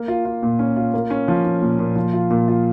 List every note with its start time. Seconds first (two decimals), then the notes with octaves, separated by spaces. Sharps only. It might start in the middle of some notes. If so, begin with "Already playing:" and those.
Already playing: A#3
0.08 F4
0.25 F4
0.43 A#2
0.59 C#4
0.76 F4
0.94 A#3
1.10 C#4
1.28 F3
1.45 C#4
1.62 A#2
1.79 A#2
1.96 F3
2.13 F4
2.30 A#2
2.48 F4